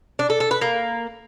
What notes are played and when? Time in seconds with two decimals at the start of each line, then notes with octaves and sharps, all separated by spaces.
0.19 D4
0.30 A4
0.40 A4
0.51 B4
0.61 A#3